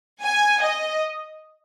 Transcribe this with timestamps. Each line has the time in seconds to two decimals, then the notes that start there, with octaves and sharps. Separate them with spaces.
0.22 G#5
0.62 D#5